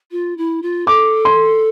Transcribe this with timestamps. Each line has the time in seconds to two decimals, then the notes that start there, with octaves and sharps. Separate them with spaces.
0.11 F4
0.38 E4
0.62 F4
0.87 A4 D6
1.25 C6